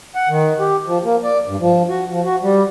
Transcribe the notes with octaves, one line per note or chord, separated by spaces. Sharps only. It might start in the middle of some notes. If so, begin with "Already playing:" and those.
F#5
D#3
G4
F3
A#3
D5
G2
F3
F#4
F3
F#4
G3